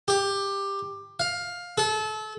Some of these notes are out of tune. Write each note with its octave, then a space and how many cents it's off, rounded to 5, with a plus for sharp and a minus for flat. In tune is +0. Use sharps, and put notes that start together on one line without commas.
G4 +15
F5 +15
A4 -30